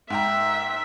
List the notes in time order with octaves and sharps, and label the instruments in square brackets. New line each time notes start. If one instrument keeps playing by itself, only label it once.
[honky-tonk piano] G#2 G5 A#5 [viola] E5